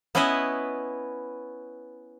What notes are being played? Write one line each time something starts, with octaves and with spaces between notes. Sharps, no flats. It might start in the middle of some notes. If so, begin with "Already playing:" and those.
B3 C#4 E4 B4 D#5 E5